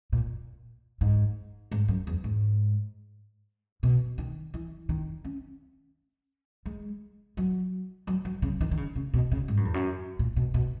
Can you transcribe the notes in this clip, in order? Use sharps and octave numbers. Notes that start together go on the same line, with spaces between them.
A#2
G#2
G#2
F#2
E2
G#2
B2
D#3
E3
D#3
C#4
G#3
F#3
F#3
F#3
C#3
D#3
D#3
C#3
C#3
B2
C#3
G#2
F#2
E2
F#2
A#2
B2
B2